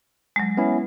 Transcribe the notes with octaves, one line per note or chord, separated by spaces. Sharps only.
F#3 G#3
B3 C#4 E4